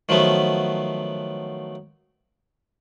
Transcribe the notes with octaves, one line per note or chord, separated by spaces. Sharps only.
D#3 F3 F#3 A3 B3